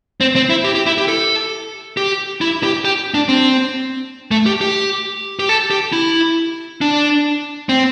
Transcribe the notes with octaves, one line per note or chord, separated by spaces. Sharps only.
C4
C4
E4
G4
G4
E4
G4
A4
G4
E4
G4
G4
D4
C4
A3
G4
G4
G4
A4
G4
E4
D4
C4